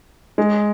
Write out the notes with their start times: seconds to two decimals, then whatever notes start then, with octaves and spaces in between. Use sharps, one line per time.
0.38 G#3